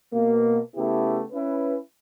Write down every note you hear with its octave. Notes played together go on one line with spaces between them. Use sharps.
B2 A#3
C#3 A3 B3 E4 G4
C#4 E4 B4